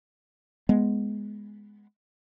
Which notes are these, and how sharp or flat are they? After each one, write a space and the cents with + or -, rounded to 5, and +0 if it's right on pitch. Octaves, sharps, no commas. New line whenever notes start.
G#3 +0 B3 +0